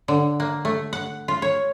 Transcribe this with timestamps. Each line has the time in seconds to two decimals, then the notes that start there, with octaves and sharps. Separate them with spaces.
0.08 D3
0.40 A#3
0.65 A3
0.93 F#5
1.28 F4
1.42 C#5